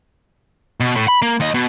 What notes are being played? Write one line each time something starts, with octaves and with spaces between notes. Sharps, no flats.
B2
A2
B5
A#3
D#2 D#5
B2